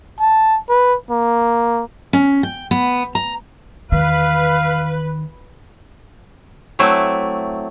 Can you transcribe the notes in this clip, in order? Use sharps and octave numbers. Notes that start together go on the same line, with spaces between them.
A5
B4
A#3
C#4
G5
B3
A#5
E2 D#3 B4 F5
F#3 A3 C4 E4 D5